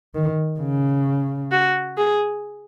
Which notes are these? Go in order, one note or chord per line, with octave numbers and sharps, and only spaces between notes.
D#3
C#3
F#4
G#4